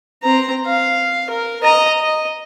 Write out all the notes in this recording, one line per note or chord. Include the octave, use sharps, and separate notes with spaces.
C4 A#5
F5
A#4
D#5 A#5
D#5